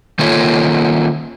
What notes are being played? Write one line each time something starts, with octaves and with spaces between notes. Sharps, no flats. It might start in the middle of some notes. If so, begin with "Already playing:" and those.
D#3 A#3 F4 A4 C#5